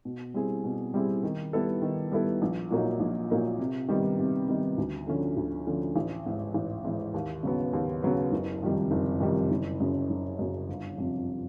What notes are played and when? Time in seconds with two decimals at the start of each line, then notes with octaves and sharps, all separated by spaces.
0.05 B2
0.34 G3 C4 E4 G#4
0.64 B2
0.94 G3 C4 E4 G#4
1.24 D#3
1.53 G3 B3 E4 A4
1.82 D#3
2.11 G3 B3 E4 A4
2.42 A#1
2.71 A#2 F#3 A#3 D#4
3.00 A#1
3.30 A#2 F#3 A#3 D#4
3.59 C3
3.88 D#3 G3 B3 D#4
4.19 C3
4.48 D#3 G3 B3 D#4
4.78 D2
5.07 D3 F3 A3 C#4
5.37 D2
5.67 D3 F3 A3 C#4
5.96 A1
6.26 G#2 E3
6.54 A1
6.84 G#2 E3
7.14 D#2
7.43 C#3 F#3 B3
7.73 D#2
8.02 C#3 F#3 B3
8.32 F#1
8.62 F2 C3 D#3 G3
8.91 F#1
9.20 F2 C3 D#3 G3
9.51 F#1
9.80 F#2 C#3
10.10 F#1
10.39 F#2 C#3
10.69 G1
10.98 F2 C3